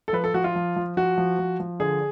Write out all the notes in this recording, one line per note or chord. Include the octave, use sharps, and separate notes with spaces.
A4
F3 B4
A4
F3 F#4
F4
F3
F3
F3 F#4
F3
F3
F3
D3 G#4